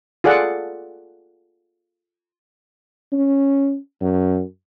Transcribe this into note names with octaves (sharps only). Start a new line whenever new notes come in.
F4 G#4 A4 D5 F#5
C#4
F#2